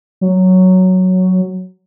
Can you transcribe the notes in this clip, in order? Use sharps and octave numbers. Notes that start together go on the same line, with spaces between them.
F#3